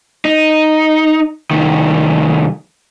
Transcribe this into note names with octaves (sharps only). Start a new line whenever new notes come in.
D#4
C2 D#3